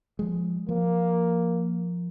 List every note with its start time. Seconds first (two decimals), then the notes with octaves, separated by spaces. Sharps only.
0.19 F3 G#3
0.69 F3 A#3